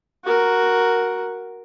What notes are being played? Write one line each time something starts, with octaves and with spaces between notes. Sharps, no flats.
F#4 A#4